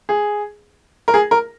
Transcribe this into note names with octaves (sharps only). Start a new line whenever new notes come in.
G#4
A#4
G#4
A#4